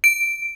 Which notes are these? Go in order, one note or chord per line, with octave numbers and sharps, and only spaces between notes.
D7